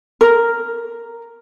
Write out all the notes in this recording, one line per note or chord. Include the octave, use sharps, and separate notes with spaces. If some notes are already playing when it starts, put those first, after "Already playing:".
A#4